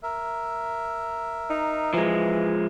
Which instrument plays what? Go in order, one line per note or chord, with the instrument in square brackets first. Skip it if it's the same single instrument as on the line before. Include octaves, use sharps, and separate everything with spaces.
[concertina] A#4 E5
[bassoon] D#4
[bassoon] E3 [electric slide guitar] F3 G#3